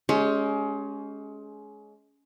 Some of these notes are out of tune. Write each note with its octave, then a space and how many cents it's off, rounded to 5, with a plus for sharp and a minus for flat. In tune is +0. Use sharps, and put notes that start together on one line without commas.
G#3 +25 C#4 +20 G4 +0